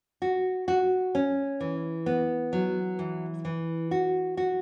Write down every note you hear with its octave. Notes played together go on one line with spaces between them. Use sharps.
F#4
F#4
C#4
E3
B3
F#3
E3
E3
F#4
F#4